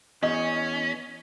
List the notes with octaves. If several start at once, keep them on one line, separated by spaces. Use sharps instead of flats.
E2 C#4 D#5